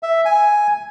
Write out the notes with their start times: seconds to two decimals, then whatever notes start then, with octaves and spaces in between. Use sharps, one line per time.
0.03 E5
0.25 G#5